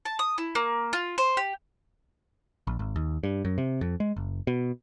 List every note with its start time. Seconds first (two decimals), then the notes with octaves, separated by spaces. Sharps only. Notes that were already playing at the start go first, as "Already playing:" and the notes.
0.05 A5
0.19 D#6
0.38 E4
0.55 A#3
0.93 F4
1.18 C5
1.37 G4
2.67 A#1
2.79 G#1
2.96 D#2
3.23 G2
3.45 F#2
3.58 C3
3.81 F2
4.00 G#3
4.16 F#1
4.47 B2